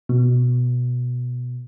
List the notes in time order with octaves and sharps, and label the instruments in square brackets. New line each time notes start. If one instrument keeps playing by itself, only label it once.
[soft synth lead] B2